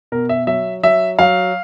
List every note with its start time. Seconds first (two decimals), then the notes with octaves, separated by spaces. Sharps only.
0.12 B2 A#4
0.29 E5
0.47 F#3 E5
0.83 F#3 E5
1.19 F#3 F5